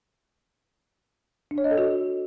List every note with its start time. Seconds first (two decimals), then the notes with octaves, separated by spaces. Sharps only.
1.51 D4
1.58 C#5
1.64 D#5
1.71 A4
1.78 F#4